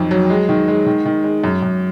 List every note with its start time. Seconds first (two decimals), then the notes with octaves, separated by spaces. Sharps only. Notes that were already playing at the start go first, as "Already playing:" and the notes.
Already playing: F2 D#3 F#3
0.11 F#3
0.30 G#3
0.49 D#3
0.68 G#3
0.86 D#3
1.05 D#3
1.24 G#3
1.44 F#2
1.62 F#2